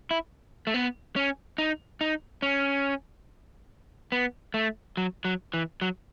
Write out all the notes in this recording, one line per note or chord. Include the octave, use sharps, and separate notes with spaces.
E4
A3
B3
C#4
D#4
D#4
C#4
B3
A3
F#3
F#3
E3
F#3